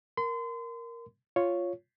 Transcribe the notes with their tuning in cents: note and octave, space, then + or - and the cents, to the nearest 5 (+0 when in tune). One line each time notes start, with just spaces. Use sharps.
A#4 +0 C6 -35
F4 +0 C#5 +0